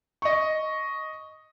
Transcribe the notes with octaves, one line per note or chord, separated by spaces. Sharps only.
D#5 C#6